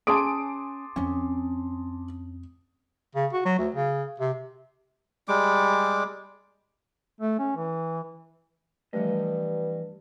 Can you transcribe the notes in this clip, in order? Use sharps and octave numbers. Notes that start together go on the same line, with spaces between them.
C#4 G#4 A5 C6 D6 D#6 D7
F2 C4 C#4
C#3
F#4
F#3
D2
C#3
C3
G3 G#3 D6
A3
C#4
E3
G2 E3 F3 G3 A3 D#5